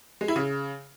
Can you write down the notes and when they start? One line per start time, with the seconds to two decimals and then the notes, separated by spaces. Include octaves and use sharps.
0.21 G#3
0.28 E4
0.36 C#3